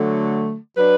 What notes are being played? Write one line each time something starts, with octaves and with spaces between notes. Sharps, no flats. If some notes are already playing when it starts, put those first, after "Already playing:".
Already playing: D3 F#3 A3
F#3 D4 B4